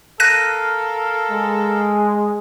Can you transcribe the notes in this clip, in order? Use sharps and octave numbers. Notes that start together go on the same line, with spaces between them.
A4 A#4 F5 F#6 A#6 D#7
G#3